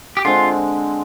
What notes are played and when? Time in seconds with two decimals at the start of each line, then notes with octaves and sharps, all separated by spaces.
0.17 G4
0.25 D3 G#3 C4 F4